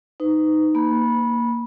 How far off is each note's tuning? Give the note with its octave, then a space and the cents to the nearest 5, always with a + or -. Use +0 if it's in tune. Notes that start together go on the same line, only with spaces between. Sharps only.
D#4 +0 B4 +40
A#3 +0 B5 -15